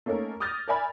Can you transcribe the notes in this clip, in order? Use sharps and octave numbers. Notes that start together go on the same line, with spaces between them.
A3 A#3 C#4 D#4 A#4
D6 D#6 F6 G6 A6 A#6
A#4 D5 E5 G#5 B5 F6